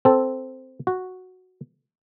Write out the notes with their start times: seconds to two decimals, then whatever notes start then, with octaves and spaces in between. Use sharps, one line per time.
0.05 C4 A4
0.87 F#4